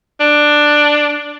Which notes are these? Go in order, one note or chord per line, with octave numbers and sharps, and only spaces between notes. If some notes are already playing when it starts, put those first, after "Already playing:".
D4